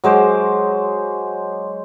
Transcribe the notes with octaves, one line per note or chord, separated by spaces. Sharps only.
F#3 G#3 C5 D6